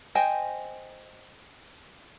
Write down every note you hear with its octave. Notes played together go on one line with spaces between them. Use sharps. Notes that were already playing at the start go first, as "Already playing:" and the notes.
C5 D#5 G5 G#5